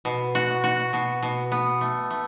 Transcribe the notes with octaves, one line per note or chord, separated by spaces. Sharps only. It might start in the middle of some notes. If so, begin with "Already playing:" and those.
B2
F#4
F#4
B2
B2
B3
A3
A3